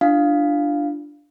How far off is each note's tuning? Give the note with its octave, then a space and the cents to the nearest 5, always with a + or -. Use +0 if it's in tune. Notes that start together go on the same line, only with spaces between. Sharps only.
D4 +0 F4 -30 F5 +0